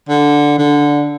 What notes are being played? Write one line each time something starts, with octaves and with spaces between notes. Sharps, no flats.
D3
D3